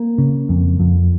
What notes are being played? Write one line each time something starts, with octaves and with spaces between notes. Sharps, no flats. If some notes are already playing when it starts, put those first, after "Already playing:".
Already playing: A#3
C#3
F2
F2